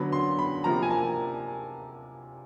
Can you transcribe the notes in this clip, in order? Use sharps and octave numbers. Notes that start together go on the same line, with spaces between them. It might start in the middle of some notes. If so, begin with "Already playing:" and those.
Already playing: D3 F#3 B3 B5
C6
B5
C3 F3 A#3 A#5
G#5
A5